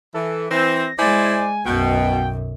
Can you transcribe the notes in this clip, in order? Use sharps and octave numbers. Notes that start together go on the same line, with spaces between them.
E3 A4
E3 C4 A#6
G#3 E4 C5 D5 G#5
B1 F#2 B2 G5